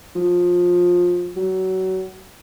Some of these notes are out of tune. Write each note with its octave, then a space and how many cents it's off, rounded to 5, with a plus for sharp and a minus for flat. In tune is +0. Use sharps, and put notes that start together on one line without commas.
F3 +20
F#3 +25